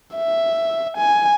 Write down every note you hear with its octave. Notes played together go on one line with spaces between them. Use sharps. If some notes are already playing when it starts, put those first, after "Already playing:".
E5
G#5